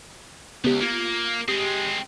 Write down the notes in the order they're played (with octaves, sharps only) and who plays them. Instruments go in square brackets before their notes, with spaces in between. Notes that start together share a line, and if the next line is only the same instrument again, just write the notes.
[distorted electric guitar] C#2 [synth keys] B3 G4
[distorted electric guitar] A#3 [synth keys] F4 G#6 C#7
[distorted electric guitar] G#3 C4 [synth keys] G4 D#6 D#7